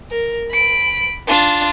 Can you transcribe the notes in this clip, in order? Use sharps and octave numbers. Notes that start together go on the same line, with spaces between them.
A#4
B5 D7
D4 F4